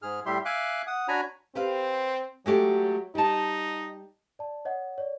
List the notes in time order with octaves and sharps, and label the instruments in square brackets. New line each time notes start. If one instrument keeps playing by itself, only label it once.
[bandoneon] G#2 G#4 F6
A2 G3 G4 E5 C6
E5 F5 G#5 D6 F#6
F#5 D#6
D4 F#4 C#5 G#5 A#5 B5
[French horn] C4 [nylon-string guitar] G4 B4 F5
[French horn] F#3 [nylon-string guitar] G#3 A3 G4
[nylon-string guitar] G3 A5 [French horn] D#4
[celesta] D5 A5
C#5 D#5 F#5
C#5 D5